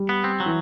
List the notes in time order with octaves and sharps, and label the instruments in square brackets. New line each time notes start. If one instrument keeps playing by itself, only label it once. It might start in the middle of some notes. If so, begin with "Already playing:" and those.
Already playing: [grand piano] G3
[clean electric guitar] B3
C4
F#3
[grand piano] E3